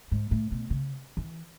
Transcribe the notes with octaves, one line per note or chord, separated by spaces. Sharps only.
G#2
A2
B2
C#3
E3